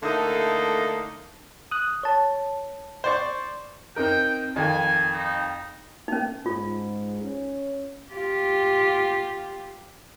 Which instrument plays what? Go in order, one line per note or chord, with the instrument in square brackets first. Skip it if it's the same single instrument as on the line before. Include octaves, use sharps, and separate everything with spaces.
[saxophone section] D3 A3 A#3 D#4 E4 A4
[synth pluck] D#6 F#6
C#5 A5
[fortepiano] C5 D5 C#6
[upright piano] C4 D#4 A#4 [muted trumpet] G5
[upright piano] F2 D#3 [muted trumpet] G#5
[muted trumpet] D#4
[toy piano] C#4 D#4
[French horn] G#2 [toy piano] F4
[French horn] C#4
[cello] F4 G4